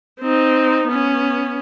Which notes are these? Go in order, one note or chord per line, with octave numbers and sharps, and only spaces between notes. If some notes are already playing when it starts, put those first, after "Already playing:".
C4 D#4
B3 C#4